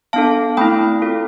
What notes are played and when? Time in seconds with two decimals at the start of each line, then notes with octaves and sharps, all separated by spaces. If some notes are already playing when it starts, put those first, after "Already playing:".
0.13 B3 D4 A4 F5 A5
0.57 A3 C4 E4 G5 B5
1.02 C4 F4 A4